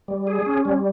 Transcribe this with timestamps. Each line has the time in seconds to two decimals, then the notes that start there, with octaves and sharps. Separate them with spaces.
0.08 G3
0.27 G#4
0.46 C#4
0.65 G3